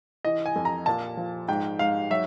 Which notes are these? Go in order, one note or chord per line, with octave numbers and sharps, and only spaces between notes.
E3 D#5
G#5
F2
A#5
A#2 A5
F3
G#2 G5
G#2 F5
F#3 E5